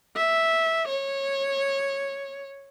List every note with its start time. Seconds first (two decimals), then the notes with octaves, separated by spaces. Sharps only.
0.16 E5
0.88 C#5